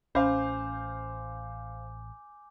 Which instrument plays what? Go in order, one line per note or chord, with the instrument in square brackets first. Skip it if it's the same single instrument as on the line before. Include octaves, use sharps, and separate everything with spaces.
[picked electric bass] A1 [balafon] C#4 [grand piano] C5 F5 [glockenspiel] G#5 D6 G6